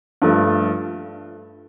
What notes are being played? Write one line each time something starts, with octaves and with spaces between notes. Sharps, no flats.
G2 F3 A3